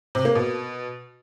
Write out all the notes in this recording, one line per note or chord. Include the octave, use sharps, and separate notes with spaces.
C3
A#3
B2